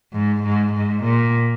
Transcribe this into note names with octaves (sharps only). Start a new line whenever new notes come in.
G#2
G#2
G#2
A#2